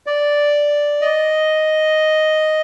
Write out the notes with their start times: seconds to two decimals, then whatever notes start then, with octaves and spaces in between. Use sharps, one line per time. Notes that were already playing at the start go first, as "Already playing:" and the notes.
0.06 D5
1.01 D#5